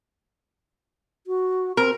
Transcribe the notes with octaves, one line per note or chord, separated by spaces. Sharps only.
F#4
C4 A#4